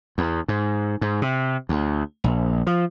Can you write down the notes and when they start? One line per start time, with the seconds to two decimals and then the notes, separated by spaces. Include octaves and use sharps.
0.18 E2
0.48 G#2
1.01 G#2
1.22 C3
1.69 D2
2.24 A#1
2.67 F3